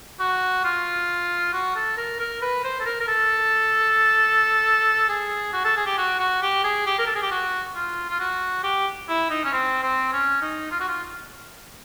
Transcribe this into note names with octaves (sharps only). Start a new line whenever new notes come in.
F#4
F4
F#4
A4
A#4
A#4
B4
C5
A4
A#4
A#4
A4
G#4
F#4
A4
G#4
G4
F#4
F#4
G4
G#4
G4
A#4
A4
G#4
G4
F#4
F4
F4
F#4
G4
E4
D#4
C#4
C4
C4
C#4
D#4
F4
F#4
F4